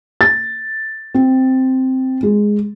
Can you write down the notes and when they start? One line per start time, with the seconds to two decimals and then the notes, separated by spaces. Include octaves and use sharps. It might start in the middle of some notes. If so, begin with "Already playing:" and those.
0.21 A6
1.14 C4
2.23 G#3